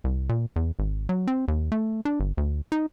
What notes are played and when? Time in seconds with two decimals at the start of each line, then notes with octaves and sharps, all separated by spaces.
0.04 C2
0.29 A#2
0.56 E2
0.79 G#1
1.09 F#3
1.27 C4
1.48 D#2
1.72 A3
2.05 D4
2.20 G1
2.37 D2
2.72 D#4